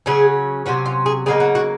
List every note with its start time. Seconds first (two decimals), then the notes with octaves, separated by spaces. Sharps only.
0.06 C#3 F#3 C#4 G#4
0.66 C3 F#3 C#4 F#4
0.86 F4
1.06 G#4
1.26 C#3 F#3 A#3 D#4 G#4
1.40 F#4
1.55 F#4